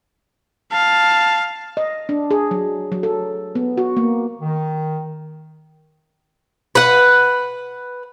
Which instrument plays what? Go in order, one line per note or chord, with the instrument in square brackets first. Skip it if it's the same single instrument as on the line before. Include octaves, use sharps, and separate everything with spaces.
[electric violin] F5 [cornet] A5
[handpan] D#5
D4
G#4
F#3
F#3
A4
B3
F#4
A#3
[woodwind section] D#3
[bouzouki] B4 F#5